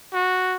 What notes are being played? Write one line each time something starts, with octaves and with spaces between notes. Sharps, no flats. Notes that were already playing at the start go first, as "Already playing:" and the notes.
F#4